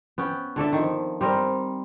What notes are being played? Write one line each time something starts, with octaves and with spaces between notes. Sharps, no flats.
B3 C#4 G5
D3 A4 D5 E5
D#3 F3
G3 C4 A#4